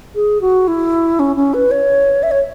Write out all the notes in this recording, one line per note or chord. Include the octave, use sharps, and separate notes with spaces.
G#4
F#4
E4
C#4
C#4
B4
C#5
E5
C#5